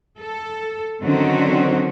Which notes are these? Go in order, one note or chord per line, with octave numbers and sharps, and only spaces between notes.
A4
D3 D#3 F#3 C4 C#4 F#4